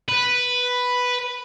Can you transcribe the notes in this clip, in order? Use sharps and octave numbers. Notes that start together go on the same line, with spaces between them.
B4